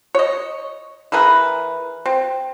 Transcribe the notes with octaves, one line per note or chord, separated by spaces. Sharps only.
C#5 D#5
E3 G#4 A#4 B4
C4